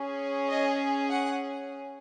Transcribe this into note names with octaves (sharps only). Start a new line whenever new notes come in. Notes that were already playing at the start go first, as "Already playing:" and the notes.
Already playing: C#4 G#4
D#5
F#5